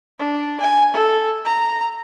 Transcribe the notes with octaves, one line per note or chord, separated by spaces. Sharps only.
D4
G#5
A4
A#5